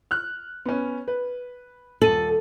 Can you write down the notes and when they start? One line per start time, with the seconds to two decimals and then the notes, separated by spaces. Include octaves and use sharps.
0.11 F6 F#6
0.66 B3 C#4
1.08 B4
2.02 D#1 A4 D#7 F#7